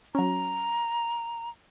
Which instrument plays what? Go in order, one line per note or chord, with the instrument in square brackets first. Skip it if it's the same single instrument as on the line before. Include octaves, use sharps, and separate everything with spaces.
[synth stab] F#3 C#4 [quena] A#5